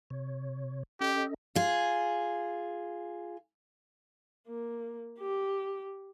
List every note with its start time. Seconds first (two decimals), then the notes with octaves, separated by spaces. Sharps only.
0.10 C3 C#5
1.00 C#4 G4 A4 D#5
1.55 F4 G#4
4.47 A#3
5.19 G4